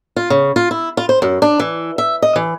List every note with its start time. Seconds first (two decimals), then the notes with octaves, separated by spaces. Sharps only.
0.16 F4
0.30 C#3
0.56 F4
0.71 E4
0.97 F4
1.09 C5
1.22 F#2
1.42 D4
1.59 E3
1.98 E5
2.22 D#5
2.36 E3